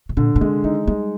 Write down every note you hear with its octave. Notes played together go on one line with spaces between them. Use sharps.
C3
A#2 D3
A#2
C3 G#3
D#3 D#4
G3 G#3